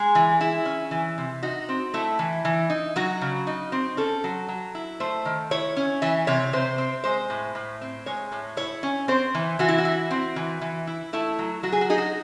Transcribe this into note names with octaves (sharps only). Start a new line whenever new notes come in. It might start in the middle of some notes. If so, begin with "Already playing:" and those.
Already playing: G#3 G#4
E3
E4
C#4
E3
C3
D#4 F#4
C4
A3 E4
E3
E3
D#4
F#3 F#4
C#3
D#4
C4
C#4 A4
F#3
F#3
E4
A3 C5
D#3
E4 C#5
C#4
E3 E5
C3 C#5
C3 C5
C4
G#3 C5
A2
A2
C4
G#3 C#5
A2
E4 C#5
C#4
C4 C5
E3
E3 F#4
E4
F#4
E4
C4
E3
E3
E4
A3 E4
F#3
F#3 F#4
G#4
F#4
D#4 G#4
F#4